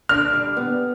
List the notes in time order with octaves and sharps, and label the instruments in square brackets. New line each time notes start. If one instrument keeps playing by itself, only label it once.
[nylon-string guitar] D3 [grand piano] F6
[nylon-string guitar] G3
B3